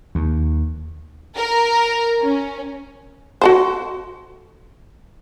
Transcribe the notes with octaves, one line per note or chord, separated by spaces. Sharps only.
D#2
A#4
C#4
F#4 A4 C5